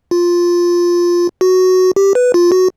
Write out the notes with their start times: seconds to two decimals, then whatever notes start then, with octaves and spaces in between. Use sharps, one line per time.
0.11 F4
1.41 F#4
1.96 G4
2.15 B4
2.34 F4
2.52 F#4